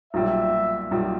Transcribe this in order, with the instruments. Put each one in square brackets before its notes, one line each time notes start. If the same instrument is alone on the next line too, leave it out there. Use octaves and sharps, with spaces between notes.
[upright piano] B1 A#2 G3 [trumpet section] E5
[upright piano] B1 A#2 G3